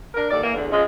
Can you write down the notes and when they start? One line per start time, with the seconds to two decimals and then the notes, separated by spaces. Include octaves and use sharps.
0.14 D4 A#4
0.29 D#2 A4 D5
0.42 E3 A#3
0.54 E2 D3
0.70 C#3 F3 G#3